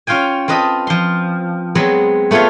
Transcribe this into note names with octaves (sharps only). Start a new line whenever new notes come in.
C#4 F4 F5 G5 G#5
C4 F4 B4 D#5 A5
F3 C6
F#3 G#3 B3 C4
A3 B3 F4 C#5 F5